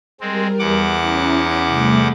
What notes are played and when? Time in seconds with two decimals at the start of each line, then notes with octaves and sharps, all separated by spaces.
0.21 G3 G#3 C4 A#4
0.59 E2 F#5 D6
1.00 C#4 E4 A#5
1.67 C3 G3 A3